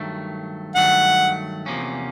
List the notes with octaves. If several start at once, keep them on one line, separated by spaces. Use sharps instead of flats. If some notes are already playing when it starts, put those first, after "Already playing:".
Already playing: G2 D#3 F#3 A3
G2 D#3 F#3 A3 F#5
E2 C3 F3 A#3 C#4